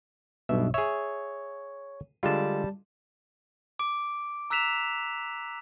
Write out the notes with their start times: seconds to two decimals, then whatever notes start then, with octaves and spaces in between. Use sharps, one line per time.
0.49 B1 G2 B2 E5
0.74 G#4 C#5 E5
2.23 D3 G3 G#3 F4 A5
3.79 D6 D7
4.50 A#5 E6 F#6 B6 E7 F7